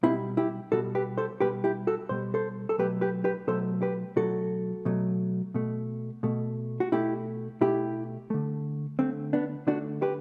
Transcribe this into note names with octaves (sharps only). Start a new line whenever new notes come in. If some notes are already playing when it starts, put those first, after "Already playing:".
B2 G3 C4 E4
E4 G4
B2 G3 F#4 A4
G4 B4
A4 C5
B2 G3 G4 B4
E4 G4
F#4 A4
B2 G3 C5
A4 C5
A4
B2 F#3 A3 G4 B4
G4 B4
G4 B4
B2 F#3 A3 A4 C5
G4 B4
B2 F#3 A3 F#4 A4
B2 F#3 A3
B2 A3
B2 A3
F#4
B2 A3 E4 G4
B2 A3 E4 G4
D3 A3
D3 A3 C4
B3 D4
D3 A3 D4 F#4
G4 B4